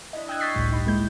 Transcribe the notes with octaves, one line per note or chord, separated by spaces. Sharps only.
D4 E4 D#5
D#5 G5 D#6 E6 F#6 G#6
C#6 G6 A6 B6 C7
G1 C#2 A2 G3
G2 G3 D#4 B5
A#1 G#3 A#3 D#4 E4 G6